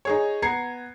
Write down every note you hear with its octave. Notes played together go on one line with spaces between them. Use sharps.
D#4 G#4 C#5
B3 A#5 G#6 C7 C#7